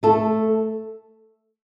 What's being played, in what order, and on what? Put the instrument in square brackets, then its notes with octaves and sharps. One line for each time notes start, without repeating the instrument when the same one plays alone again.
[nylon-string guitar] A3 A4